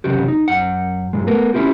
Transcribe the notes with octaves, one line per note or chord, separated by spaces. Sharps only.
C2 F#2 C#3 F#4 G4
D#4
F#2 F#5
G2 A#2 G#3
A3 B3 A#4
C#4 D4 E4 F4 G4